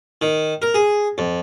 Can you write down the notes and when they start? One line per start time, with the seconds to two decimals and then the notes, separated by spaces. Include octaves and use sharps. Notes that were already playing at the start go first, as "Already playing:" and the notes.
0.22 D#3
0.62 A#4
0.74 G#4
1.18 F2